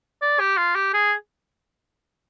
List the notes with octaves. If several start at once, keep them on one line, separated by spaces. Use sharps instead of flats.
D5
G4
F4
G4
G#4